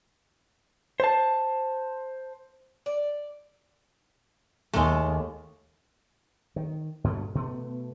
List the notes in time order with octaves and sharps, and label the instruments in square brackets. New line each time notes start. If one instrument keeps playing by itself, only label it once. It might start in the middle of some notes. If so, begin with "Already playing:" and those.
[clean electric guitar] C5 A5
[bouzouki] D5
[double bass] D#2 [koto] G#3 A3
[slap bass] D#3
G2 B2 D3 A3
B2 A3 B3